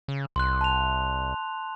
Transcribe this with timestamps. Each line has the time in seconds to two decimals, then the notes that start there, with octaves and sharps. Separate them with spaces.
0.08 C#3
0.36 C2 C6 F#6
0.61 A5 F7